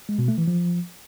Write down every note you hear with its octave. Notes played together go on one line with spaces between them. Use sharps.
G#3
B2
A3
E3
F3